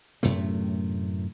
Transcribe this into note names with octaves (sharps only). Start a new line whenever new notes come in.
F#2 A2 C3 A3